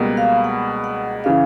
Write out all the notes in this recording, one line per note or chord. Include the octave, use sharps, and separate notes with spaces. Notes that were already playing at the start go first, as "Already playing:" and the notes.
Already playing: C#2 B2 G3 A#3
F5
F#5
F#5
C#3 E3 F5